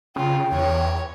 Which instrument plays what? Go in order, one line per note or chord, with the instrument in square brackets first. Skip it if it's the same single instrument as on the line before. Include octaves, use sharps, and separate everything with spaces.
[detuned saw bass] C#3 [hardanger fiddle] F4 [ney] G5
[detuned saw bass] E2 [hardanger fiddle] C#5